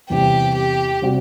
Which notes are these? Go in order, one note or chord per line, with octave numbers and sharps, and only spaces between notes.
E2 C3 G3 G4
G4
C3 G3 C4 F#4